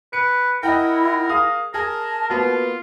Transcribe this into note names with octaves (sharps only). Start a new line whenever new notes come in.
B4 C#7
E4 A#4 D#5 F#5 G5
G#4 F5 D#6
G#4 A#4 A5
A#3 B3 F4 F#4